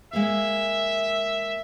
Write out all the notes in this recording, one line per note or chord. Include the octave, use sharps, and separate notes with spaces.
G#3 A#3 E5 F5